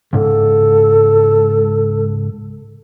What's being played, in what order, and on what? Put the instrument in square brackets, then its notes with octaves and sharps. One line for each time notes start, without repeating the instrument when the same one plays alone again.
[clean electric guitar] C#2 G#2 [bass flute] A4